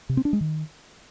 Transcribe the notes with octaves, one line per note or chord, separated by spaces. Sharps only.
C3
C4
D4
G#3
D#3